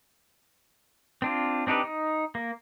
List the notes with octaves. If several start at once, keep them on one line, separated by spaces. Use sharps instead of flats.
C4 D4 F4
C4 D4 D#4 G4 B4
D#4
A#3